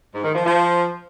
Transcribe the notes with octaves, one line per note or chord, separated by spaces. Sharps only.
G#2
D#3
F3
F3